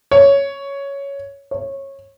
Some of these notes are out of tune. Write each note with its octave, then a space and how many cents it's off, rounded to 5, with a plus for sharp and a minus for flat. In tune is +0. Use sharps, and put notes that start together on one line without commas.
C#5 +5
C#5 -20